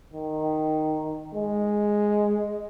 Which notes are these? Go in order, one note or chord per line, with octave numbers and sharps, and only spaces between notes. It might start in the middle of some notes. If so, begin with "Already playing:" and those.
D#3
G#3